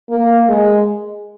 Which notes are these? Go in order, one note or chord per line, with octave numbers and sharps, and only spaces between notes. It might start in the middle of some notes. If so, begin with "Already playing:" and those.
A#3
G#3